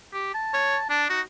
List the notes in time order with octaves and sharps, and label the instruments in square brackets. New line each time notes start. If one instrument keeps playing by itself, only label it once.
[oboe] G4
A5
[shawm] C#5
[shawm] D4 [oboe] A5
[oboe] D#4 [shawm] F#4